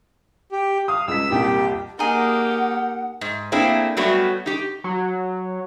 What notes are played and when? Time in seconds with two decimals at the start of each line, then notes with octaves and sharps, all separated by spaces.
0.52 G4
0.88 F5 D#6
1.08 C#2 G#3 E6 B6
1.31 C2 F2 A#2 G4
1.99 A#3 D#4 G4 G#4 F#5
3.21 G#2
3.52 A3 A#3 C4 D4 E4 G#4
3.97 F#3 G3 A3 B3 F#4
4.46 D#4 G4
4.84 F#3